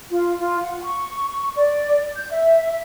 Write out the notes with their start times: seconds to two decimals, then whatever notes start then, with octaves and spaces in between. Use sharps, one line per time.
0.11 F4
0.39 F4
0.63 F#5
0.83 C#6
1.56 D5
2.16 G6
2.31 E5